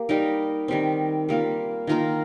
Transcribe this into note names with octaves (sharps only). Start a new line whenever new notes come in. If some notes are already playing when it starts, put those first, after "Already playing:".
Already playing: A#3 G4
G3 D#4 A#4
D#3 G3 C4
G3 A#3 F4
D#3 A#3 F4 A#4